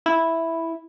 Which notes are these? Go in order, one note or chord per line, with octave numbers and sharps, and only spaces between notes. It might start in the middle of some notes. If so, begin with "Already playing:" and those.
E4